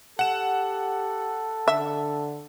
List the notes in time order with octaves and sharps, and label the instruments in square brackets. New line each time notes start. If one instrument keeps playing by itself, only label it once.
[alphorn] G4 [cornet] A4 [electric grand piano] F#5 E7
[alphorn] D3 [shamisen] E5